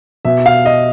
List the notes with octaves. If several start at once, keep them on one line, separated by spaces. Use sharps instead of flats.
B2 E5
F5
D#5